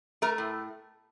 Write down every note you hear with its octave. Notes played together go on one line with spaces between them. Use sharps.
A3 A#4
A2